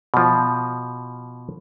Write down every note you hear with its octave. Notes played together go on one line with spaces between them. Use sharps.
B2 F3